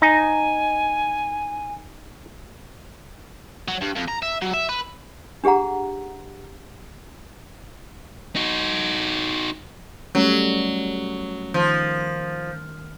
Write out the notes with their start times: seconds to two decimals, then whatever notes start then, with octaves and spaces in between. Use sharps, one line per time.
0.02 D#4 G#5
3.68 F#3
3.81 G2
3.96 F2
4.08 A#5
4.22 E5
4.42 F#3
4.53 E5
4.69 B4
5.44 D4 G4 G#4 F#5 A#5
8.36 D#4 F#4
10.15 F#3 G3 A3 C#4
11.54 D#3 F3